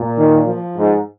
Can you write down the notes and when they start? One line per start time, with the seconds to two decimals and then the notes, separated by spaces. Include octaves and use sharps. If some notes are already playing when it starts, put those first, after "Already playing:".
Already playing: A#2
0.18 D#3
0.47 F3
0.77 G#2